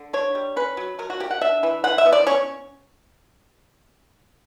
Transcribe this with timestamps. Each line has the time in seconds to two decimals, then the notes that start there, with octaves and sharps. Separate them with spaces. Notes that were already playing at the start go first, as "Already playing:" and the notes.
Already playing: D3
0.13 D4 C#5
0.35 G3
0.56 C#4 B4
0.77 F#3
0.99 F#3 A#4
1.10 F#4
1.20 A#3 G4
1.31 F#5
1.41 D4 E5
1.63 E3
1.84 E3 F#5
1.98 E5
2.06 B3
2.12 D5
2.26 C#4 C#5